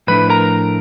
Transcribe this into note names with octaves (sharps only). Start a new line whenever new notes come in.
A2 F3 A3 D4 B4 B5
A#4 A#5